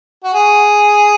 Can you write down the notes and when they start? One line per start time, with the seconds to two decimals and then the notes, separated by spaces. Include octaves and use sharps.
0.24 F#4
0.34 G#4